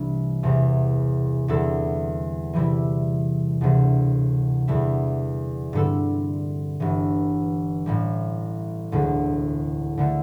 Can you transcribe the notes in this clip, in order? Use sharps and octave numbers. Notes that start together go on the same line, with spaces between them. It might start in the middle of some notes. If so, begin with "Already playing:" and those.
Already playing: C2 C3 E3 G3 D4
E1 E2 C3
E2 D3 G3 C4 A4
C3 E3 G3 E4 G4
E1 D2 C3 E3
E2 D3 G3 E4
G2 D3 G3 C4 A4
G1 G2 E3
A1 A2 G3
E1 D2 D3
D2 D3 A3